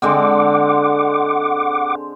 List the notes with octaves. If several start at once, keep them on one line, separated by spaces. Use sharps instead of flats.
D3 G#3 C4 F#5 D6